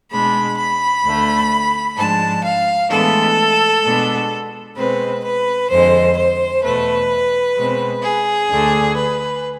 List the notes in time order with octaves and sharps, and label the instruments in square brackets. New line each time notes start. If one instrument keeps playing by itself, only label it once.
[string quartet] B2 G#3 D4 B5
B5
D2 D3 A3
G#2 F3 G#3 D4 A5
F5
A2 E3 G#3 B3 D4 A4
B2 G#3 B3 D4
B2 G#3 C4 B4
B4
F2 D3 G#3 C5
C5
E2 B2 A3 B4
B2 G#3 C4
G#4
D2 D3 A3 D4
B4